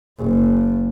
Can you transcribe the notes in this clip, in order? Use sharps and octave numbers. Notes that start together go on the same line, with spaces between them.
F#1